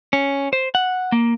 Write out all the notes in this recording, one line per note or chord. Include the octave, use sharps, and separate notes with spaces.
C#4
C5
F#5
A#3